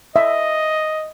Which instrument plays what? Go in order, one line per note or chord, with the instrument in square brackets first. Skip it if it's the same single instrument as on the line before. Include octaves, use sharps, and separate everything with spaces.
[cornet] D#5 [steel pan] E5